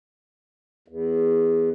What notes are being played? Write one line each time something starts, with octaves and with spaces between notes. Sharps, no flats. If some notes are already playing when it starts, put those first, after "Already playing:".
E2